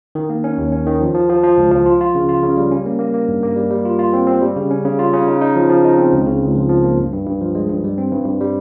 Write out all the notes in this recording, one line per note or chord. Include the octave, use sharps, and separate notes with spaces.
D#3
A#3
C#4
D#2
C#4
D#3
F3
F3
F3
F3
C#2
F3
F4
F4
C#3
F4
C#3
G3
C#4
A#3
A#3
A#3
G2
A#3
G3
G3
F4
F4
C4
C4
G3
C#3
C#4
C#3
F4
C#3
D#4
D#4
F3
F3
D#4
C4
C#2
C#3
C#2
F3
F3
A#3
G2
G2
G2
F3
G#3
G2
G3
C4
G2
G2
G3